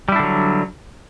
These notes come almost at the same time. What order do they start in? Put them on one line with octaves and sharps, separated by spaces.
G3 E4 D4 D3 F#3